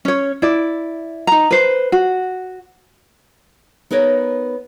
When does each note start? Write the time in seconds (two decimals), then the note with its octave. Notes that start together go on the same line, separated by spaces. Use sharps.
0.05 C#4 C#5
0.42 E4 D5
1.27 D#4 A#5
1.51 B4 C5
1.92 F#4
3.91 B3 D#4 A#4 B4 C#5